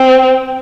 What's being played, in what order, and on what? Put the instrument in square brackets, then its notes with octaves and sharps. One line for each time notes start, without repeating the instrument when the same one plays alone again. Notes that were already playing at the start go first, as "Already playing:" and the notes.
Already playing: [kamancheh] C4